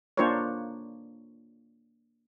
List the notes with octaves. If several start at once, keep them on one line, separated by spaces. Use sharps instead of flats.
A#3 D4 F4 A#4 C5 C#5